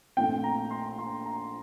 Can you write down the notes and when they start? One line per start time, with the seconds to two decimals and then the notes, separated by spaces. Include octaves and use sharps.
0.17 A#1 A#2 A3 C4 G5
0.44 A#5
0.71 C6
0.98 C6
1.26 A#5